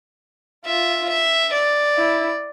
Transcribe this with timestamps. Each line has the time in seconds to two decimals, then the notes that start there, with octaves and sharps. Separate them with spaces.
0.65 F4 E5
1.09 E5
1.53 D5
1.97 E4